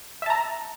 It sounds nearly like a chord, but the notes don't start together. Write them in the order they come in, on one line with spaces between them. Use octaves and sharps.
E5 A5 A#5